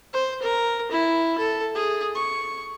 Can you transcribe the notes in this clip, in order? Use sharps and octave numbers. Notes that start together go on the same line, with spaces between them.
C5
A#4
E4
A4
G#4
C#6